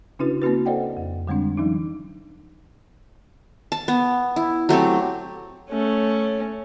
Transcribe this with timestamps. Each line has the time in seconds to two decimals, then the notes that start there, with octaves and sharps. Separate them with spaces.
0.19 C#3 C#4 D4 E4 F#4 B4
0.42 A#3 C4 C#4 F#4 B4
0.66 A4 C5 D5 D#5 F#5 G5
0.97 F2
1.27 D3 G3 G#3 C4 D4
1.57 E3 F#3 C#4 D#4
3.72 A5
3.88 B3
4.36 E4
4.69 F#3 A3 C4 G4
5.70 A3 C#4